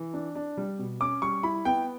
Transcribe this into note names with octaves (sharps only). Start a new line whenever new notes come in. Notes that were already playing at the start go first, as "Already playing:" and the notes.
Already playing: E3
D4
D4
G3
B2
C#4 D6
G3 C#6
E4 B5
B3 G5